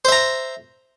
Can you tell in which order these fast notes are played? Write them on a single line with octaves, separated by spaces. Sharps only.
C5 E5 A#5